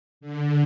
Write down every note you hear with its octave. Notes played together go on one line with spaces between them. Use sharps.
D3